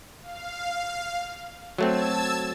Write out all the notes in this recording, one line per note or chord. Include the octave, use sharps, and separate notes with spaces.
F5
F#3 A3 C4 A5 E6 G#6